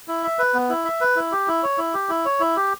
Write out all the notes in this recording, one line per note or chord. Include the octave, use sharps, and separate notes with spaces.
E4
E5
B4
B3
E4
E5
B4
E4
G4
E4
C#5
E4
G4
E4
C#5
E4
G4